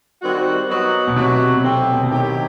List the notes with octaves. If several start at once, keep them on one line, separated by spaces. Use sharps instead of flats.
D#3 G3 C4 F#4
F#3 B3 D#4 F#4
B2
C3 F#3 B3 F#4
A2 C3 F#3 C4
B2
C3
D#3 F#3 C4 E4 G4